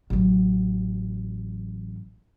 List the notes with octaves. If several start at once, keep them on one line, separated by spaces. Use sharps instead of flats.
A1 F#3